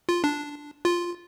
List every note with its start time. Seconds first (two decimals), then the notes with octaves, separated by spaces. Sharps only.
0.09 F4
0.24 D4
0.85 F4